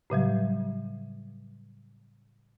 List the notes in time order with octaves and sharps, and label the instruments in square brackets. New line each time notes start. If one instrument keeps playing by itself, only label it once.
[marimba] A2 C#3 F#3 G3